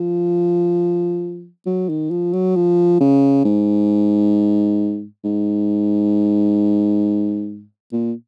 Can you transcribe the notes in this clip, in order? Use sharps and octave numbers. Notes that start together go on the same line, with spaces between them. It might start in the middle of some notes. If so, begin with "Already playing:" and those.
Already playing: F3
F#3
D#3
F3
F#3
F3
C#3
G#2
G#2
A#2